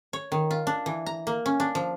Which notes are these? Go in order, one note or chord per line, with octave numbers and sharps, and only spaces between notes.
C#5
D#3
F4
D4
E3
A#5
A#3
C#4
D4
F3